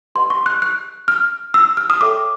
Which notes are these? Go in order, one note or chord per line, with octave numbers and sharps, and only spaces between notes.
G4 B4 D#5 F#5 C6
C#6
F#6
F#6
F6
E6
F6
D#6
A4 C#5 E5 G5 D6